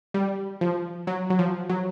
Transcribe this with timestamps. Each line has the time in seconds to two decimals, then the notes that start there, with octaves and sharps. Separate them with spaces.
0.14 G3
0.61 F3
1.07 F#3
1.30 F#3
1.39 F3
1.70 F#3